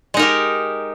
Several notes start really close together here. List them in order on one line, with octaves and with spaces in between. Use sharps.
G#3 D#4 A#4 G4